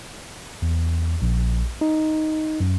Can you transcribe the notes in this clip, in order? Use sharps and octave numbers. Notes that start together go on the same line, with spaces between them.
E2
A#1
D#4
F#2